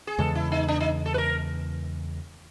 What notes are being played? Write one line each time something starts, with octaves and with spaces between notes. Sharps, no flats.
G#4
E2 C#3 E3 G#3 A4
E4
D#4
D4
D#4
A4
B4
A#4